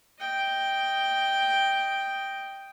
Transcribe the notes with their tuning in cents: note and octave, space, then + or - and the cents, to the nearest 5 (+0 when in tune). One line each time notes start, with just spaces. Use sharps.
D#5 +0 G5 +0